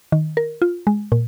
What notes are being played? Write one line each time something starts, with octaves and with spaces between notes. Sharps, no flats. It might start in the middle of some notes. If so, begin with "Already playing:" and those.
D#3
A#4
F4
G#3
A#2